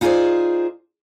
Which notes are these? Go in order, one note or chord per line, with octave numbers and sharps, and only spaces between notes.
D#4 F4 G#4 A#4 C5 D5